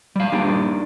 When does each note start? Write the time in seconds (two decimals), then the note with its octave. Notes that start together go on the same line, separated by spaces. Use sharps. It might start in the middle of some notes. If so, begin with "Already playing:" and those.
0.16 G3 F5
0.32 G3 A#3 D4 D#4 G4